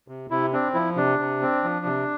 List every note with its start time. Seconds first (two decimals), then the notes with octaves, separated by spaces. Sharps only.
0.08 C3
0.30 C3 E4
0.53 C4 D4
0.74 F3 E4
0.96 C3 D4
1.19 C3
1.42 C4
1.64 F3
1.86 C3